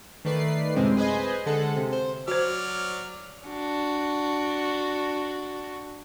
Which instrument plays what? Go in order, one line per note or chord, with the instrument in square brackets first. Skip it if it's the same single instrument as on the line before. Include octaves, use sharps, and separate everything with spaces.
[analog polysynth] D#3 A3 B4 D5 C7
F#2 A2 C3 G#3 C4
G#4 B4 C5 D#5 G#5
D3 G#3 A4 F#5
C3
C5
[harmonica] F#3 D5 F6 [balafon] F#4 C5
[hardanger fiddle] D4 F#4